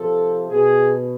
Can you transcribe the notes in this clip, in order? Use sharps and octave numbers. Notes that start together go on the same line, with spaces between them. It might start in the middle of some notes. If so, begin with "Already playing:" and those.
Already playing: C3 F3 A4
B2 G#4